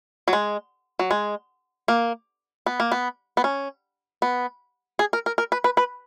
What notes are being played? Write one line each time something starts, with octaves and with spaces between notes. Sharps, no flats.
F#3
G#3
F#3
G#3
A#3
B3
A#3
B3
B3
C#4
B3
G#4
A#4
A#4
A#4
B4
B4
B4